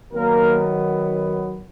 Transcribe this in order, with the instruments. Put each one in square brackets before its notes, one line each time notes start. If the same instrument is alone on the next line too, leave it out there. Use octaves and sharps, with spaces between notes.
[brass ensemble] D#3 F#3 A#3 B3 A#4